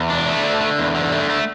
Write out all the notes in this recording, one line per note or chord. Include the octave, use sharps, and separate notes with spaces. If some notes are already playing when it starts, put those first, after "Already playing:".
Already playing: E2
D4
A3
D3
D3
E2
D3
A3
A3